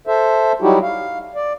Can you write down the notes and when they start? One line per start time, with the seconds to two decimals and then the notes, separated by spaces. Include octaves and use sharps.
0.07 A4 C5 E5
0.62 F#3 G3 D#4 E4 F#4 G4
0.82 F5
1.35 D5